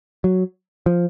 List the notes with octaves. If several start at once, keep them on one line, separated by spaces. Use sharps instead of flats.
F#3
F3